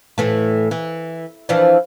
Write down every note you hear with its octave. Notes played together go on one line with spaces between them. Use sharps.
A2 E3 A3
E3
E3 F3 D4